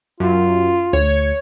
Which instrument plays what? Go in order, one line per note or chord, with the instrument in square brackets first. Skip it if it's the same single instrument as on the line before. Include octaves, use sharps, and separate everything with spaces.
[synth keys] F#2 [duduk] F4
[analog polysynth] D2 [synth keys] C#5